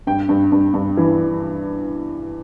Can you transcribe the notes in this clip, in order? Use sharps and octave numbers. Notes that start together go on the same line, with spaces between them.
G2 G5
G2
G2
G2
E3